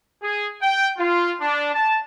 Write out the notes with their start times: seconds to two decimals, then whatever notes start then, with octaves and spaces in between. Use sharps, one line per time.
0.22 G#4
0.60 G5
0.98 F4
1.40 D4
1.73 A5